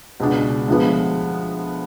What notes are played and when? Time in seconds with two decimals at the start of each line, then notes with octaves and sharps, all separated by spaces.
0.20 C#2 B2 G#3 B3 D4
0.68 D2 D3 F3 G#3 B3